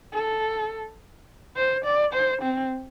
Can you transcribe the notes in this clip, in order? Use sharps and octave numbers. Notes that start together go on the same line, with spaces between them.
A4
C5
D5
C5
C4